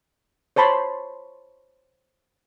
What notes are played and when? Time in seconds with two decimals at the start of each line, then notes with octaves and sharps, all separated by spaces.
0.56 C5 C#5 A5 B5 C6